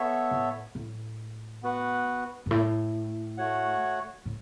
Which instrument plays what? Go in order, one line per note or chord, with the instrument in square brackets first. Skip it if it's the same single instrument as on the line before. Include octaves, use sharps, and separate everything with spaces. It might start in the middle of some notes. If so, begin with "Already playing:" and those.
Already playing: [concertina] B3 A4 C#5 E5
[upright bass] A2
A2
[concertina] B3 F#4 B4 F#5
[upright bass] F#2
A2
[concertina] A3 F#4 C#5 F#5
[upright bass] A2